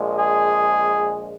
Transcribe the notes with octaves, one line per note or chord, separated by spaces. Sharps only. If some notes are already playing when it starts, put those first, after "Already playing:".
Already playing: A#1 A#2 G#3
G#4